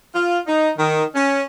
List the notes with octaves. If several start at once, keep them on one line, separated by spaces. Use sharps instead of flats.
F4
D#4
D#3
C#4